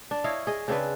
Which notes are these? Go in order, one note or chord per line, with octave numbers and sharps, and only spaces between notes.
D4
E4 C#5 D#5 F5
G#4 D#5
C#3 C4 D4 B4